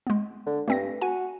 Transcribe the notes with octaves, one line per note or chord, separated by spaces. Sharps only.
G#3 B3
D3
G2 A3 C4 A#6
F#4 G#5